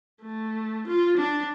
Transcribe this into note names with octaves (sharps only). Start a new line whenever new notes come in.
A3
F4
D4